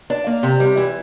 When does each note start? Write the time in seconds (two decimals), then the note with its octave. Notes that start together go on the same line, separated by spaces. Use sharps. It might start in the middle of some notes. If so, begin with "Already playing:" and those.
0.10 D4
0.27 A#3
0.43 C3
0.60 G3
0.77 E3